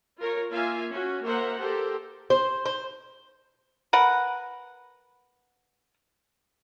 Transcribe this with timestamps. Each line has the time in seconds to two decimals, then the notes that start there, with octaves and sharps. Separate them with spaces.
0.20 F4 A#4 C#5
0.51 A#3 F4 E5 F5 G#5
0.90 C#4 F#4
1.25 A#3 A#4 C5 E5 F#5
1.58 G4 A4 A#4 C5
2.30 C5
2.66 C5
3.93 A#4 B4 F#5